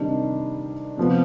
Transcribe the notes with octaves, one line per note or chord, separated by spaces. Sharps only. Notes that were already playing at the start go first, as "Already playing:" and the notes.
Already playing: C3 D#3 G3 D4
C3 F3 B3